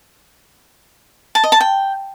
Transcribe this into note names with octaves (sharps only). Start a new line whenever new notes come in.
A5
D#5
A5
G5